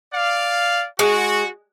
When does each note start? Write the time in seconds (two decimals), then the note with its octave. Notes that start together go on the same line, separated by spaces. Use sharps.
0.13 D5 F5
0.99 G#3 F#4